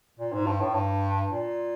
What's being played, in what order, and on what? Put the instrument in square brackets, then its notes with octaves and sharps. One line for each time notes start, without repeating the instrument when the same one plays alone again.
[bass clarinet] A#2
G#2
G2
A2
G2
A#2